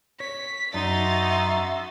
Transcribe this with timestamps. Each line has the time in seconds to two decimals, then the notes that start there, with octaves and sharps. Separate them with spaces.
0.20 C#5 B6
0.74 F#2 D#4 F#4 E5 C6 A6